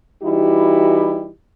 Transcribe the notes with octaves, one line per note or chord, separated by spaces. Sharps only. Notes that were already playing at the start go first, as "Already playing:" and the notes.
E3 G3 D#4 E4 F#4 G4